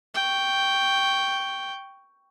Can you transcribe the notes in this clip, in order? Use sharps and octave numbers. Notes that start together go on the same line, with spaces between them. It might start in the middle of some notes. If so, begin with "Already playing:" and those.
G5 C#6